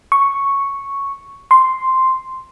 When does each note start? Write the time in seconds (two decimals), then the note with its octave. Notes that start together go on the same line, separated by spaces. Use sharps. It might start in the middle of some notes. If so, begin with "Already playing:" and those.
0.12 C#6
1.51 C6